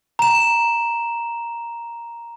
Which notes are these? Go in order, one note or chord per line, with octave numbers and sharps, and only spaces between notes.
A#5 E7